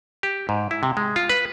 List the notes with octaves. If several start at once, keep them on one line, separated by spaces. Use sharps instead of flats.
G4
G#2
E4
C3
G#3
F4
B4